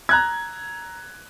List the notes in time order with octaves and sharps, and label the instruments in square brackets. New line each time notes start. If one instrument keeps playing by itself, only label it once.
[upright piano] A#5 F#6 G#6